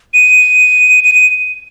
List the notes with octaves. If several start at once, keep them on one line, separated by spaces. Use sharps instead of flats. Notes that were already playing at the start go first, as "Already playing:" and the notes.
D#7
D#7
D#7